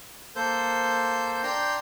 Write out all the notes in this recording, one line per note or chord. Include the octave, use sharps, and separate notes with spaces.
A#3 A4 C5 G6
D4 G5 A#5 C6 G6